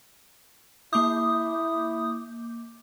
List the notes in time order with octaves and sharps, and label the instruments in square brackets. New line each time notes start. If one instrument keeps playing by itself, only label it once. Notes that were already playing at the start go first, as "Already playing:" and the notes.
[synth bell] A#3 D6 G6 [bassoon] E4 [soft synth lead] D#6